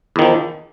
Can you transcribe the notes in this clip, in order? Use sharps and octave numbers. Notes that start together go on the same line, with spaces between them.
E2 D#3 F3